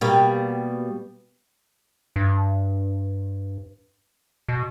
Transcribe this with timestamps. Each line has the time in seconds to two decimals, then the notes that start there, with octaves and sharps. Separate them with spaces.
0.01 B2 G3 A#3
2.16 G2
4.49 B2